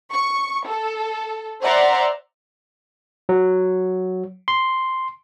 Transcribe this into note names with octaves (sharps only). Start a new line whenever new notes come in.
C#6
A4
C5 D5 E5 F#5 A#5 C6
F#3
C6